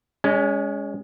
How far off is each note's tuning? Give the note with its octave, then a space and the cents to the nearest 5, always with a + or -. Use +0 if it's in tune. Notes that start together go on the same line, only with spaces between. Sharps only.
G#3 -15 C#4 +25